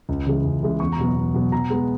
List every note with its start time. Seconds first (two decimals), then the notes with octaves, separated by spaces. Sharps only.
0.09 C#2
0.26 C#3 E3 G#3
0.44 C#2
0.62 C#3 E3 G#3
0.80 E2 C#6
0.92 A#5
0.99 B2 F#3 B3
1.16 E2
1.34 B2 F#3 B3
1.52 B2 A#5
1.70 G#3 B3